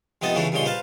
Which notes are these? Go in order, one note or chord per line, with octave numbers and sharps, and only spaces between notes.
F2 C3 B3 D#4 D#5 A5
C#3 E3 A3 D4 E4 A4
G2 A#2 C#3 D#4 C#5 C6
B4 C5 F5 A5